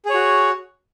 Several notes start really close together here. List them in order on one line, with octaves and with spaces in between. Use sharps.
G#4 C#5 F#4